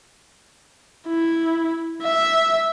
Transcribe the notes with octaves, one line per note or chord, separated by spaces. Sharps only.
E4
E5